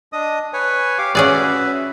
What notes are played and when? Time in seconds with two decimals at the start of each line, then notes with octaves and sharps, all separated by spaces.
0.13 D4 D#5 D#6
0.53 B4 C#5 G#5
0.98 G4 F5 D6
1.15 C#4 F#4 G#4 B4 D5 E5